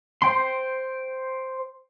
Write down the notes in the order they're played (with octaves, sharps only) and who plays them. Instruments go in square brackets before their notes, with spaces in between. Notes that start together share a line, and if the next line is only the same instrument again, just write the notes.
[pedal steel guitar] C5 G5 C6